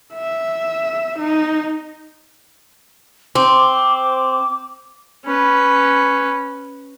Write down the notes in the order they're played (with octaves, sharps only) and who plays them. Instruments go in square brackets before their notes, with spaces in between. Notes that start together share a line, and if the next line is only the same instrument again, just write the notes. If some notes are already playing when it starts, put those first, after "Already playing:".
[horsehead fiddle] E5
D#4
[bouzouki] C4 [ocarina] D6
[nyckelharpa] C#4 B4